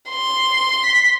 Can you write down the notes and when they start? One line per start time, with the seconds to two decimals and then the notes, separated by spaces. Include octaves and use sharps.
0.10 C6
0.83 B6